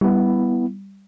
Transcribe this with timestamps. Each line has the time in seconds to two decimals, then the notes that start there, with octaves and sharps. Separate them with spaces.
0.01 G3 B3 E4